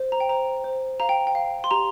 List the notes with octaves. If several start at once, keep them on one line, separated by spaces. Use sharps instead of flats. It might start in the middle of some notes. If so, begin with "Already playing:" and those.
Already playing: C5
A#5
G5
C5 A#5
C5
F5 A#5
G5
G5
F5
C6
G4 A#5